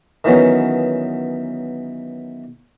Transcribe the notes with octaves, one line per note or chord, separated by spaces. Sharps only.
D#3 E3 F#3 B3 C#4